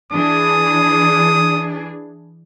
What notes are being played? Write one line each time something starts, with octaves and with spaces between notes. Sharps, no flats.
E3 D4 G#4 D#6